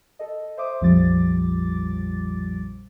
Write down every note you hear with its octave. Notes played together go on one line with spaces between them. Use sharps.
A4 D#5
C5 E5 D6 D#6
A#1 F2 F3 G3 D6 A6